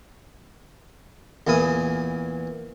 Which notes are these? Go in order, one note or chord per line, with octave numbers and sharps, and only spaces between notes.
E2 A#2 E3 G#5 D#6